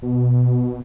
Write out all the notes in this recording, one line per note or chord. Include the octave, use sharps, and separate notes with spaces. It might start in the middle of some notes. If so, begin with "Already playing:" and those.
B2